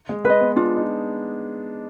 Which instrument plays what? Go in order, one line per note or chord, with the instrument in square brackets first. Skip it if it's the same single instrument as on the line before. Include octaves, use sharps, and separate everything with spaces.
[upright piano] G#3
[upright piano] G#3 [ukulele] B4 D#5
[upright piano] B3
[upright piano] D4 [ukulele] F4
[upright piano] D#4